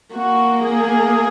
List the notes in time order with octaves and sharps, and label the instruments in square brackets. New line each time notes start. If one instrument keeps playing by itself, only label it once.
[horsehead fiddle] A#3 [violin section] F#4
[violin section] G#4